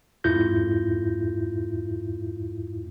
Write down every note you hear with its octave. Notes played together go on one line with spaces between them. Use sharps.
F2 G#2 E4 F4 G6 A#6